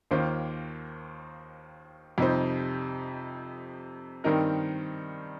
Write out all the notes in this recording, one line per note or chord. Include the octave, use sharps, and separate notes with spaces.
D#2 D#3 A#3 F4 C5
F2 C3 G3 D#4 C5
G2 D#3 C4 D#4 A#4